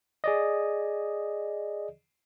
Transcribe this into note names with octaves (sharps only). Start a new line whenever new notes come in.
G#4 D5 D#5